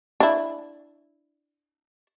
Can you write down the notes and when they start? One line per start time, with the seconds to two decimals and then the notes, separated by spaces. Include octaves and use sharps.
0.20 D4 E4